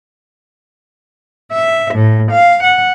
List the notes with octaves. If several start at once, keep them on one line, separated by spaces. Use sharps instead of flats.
E5
A2
F5
F#5